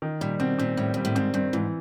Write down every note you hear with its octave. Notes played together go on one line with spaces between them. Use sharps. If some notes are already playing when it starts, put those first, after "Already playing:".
D#3
A#2 G3
B2 C4
A#2 C4
A2 G3
A#2 G3
A2
G#2 C4
G2 C4
G#2 E3